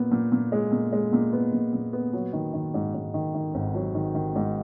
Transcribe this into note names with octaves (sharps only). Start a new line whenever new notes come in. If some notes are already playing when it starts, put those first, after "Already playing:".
Already playing: A#2 B3
A#2
A#2
G#3
A#2
G#3
A#2
B3
A#2
A#2
B3
F#3
D#3
D#3
G#2
G#2
D#3
D#3
G#1
F#3
D#3
D#3
G#2